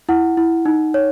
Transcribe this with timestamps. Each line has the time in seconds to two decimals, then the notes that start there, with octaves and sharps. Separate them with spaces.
0.09 E4 F#5
0.37 E4
0.66 D#4
0.94 C#5